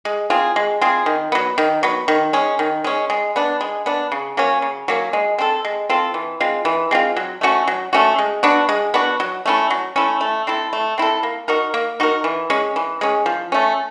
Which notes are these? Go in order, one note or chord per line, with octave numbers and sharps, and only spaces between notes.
G#3
C4 F4 G#4
G#3
C4 F4 G#4
D#3
F#3 B3
D#3
F#3 B3
D#3
G#3 C#4
D#3
G#3 C#4
G#3
B3 D4
G#3
B3 D4
C#3
F#3 A#3 C#4
C#3
F#3 A#3 C#4
G#3
C4 F4 A4
G#3
C4 F4 A4
E3
G#3 C4 F4
E3
G#3 C4 F4
F#3
A3 C#4 F#4
F#3
A3 C#4 F#4
G#3
B3 D4 F#4
G#3
B3 D4 F#4
F#3
A3 C#4 E4
F#3
A3 C#4 E4
A3
C4 E4 A4
A3
C4 E4 A4
A#3
D#4 F#4 A#4
A#3
D#4 F#4 A#4
E3
G#3 C#4
E3
G#3 C#4
F3
A3 C#4